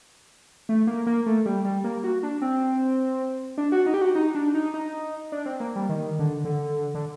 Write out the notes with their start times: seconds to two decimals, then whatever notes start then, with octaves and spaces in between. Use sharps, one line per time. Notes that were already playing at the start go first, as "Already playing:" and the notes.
0.69 A3
0.87 A#3
1.07 A#3
1.26 A3
1.46 G3
1.65 G3
1.84 A#3
2.04 F#4
2.23 D4
2.42 C4
3.58 D4
3.72 F#4
3.86 D#4
3.94 G4
4.02 F#4
4.15 D#4
4.35 D4
4.54 D#4
4.74 D#4
5.32 D4
5.46 C4
5.60 A#3
5.76 G3
5.89 D#3
6.19 D3
6.45 D3
6.95 D3